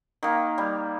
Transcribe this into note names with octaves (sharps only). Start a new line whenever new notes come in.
D#3 A#3
G3